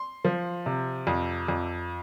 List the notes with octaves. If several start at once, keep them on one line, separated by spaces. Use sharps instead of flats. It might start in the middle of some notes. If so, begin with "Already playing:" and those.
Already playing: C6
F3
C3
F2
F2